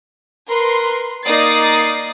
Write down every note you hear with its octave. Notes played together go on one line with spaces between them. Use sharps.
A#4 B4 C6
A#3 D#4 D5 D#6 A6 C7